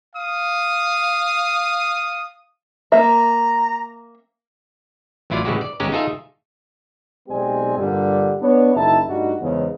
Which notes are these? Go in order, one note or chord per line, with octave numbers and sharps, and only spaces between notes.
F5 D#6
A#3 E5 A#5
A1 F#3 E4 F4 D5 F5
A2 C#3 E3 G#3 F#4 G4
D5
G1 G#3 C#4 G4 A#5
D#4 F4 G#4 A4 E5 F5
B1 G#3 C4 G4 D5 G#5
G2 A#2 D3 G3
B3 D4 C#5
F#1 D#4 E4 E5 A5
G2 G3 A3 D#4 F#4
E2 G#2 C#3